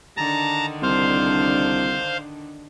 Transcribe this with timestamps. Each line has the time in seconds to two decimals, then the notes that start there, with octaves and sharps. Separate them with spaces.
0.17 D3 D#3 D4 A5 A#5
0.82 C2 C5 F5